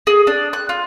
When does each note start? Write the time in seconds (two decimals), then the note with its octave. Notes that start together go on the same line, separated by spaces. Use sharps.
0.07 G#4
0.27 D4
0.53 F#6
0.69 F4